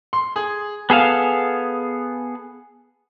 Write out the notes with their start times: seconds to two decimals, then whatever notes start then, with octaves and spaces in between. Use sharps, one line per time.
0.13 C6
0.36 G#4
0.90 B3 G#4 A4 F5